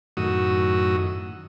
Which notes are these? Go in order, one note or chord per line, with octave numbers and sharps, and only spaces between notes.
F#2 A2 D#3 F#4 D#6 E6